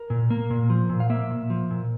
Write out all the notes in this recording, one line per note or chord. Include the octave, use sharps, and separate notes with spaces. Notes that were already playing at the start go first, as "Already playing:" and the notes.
Already playing: A#4
A#2
A#3
A#2
F3
A#2
F5
A#3 E5
A#2
F3
A#2